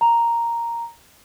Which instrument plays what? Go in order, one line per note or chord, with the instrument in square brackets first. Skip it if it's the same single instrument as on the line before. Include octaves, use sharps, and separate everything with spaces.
[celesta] A#5